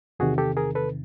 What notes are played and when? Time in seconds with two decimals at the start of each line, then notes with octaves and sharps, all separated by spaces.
0.19 E2 C3 D#3 F#4 G#4
0.38 G4 A4
0.57 G#4 A#4
0.75 A4 B4